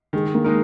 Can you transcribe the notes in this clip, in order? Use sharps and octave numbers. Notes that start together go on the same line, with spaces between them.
D#3 G#3
A#3
G#3 D#4 A#4